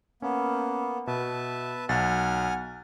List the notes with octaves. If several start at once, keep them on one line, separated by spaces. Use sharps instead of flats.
A#3 B3 C#4
B2 B4 E5 A5
B1 F#5 G#5 F6 A6